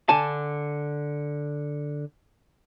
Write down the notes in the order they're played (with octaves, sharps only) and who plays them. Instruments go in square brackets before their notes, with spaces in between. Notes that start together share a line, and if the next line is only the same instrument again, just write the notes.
[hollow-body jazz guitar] D3 G#5 A5